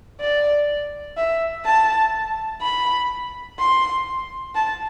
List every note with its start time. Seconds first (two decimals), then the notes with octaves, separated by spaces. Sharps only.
0.20 D5
1.17 E5
1.65 A5
2.62 B5
3.59 C6
4.55 A5